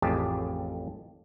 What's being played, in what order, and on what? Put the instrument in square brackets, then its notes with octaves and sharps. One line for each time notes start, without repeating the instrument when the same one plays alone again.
[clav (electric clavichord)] A1 F2 A2 G4 G#4 A5